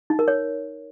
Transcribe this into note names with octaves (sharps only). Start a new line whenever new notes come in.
D#4
A#4
C#5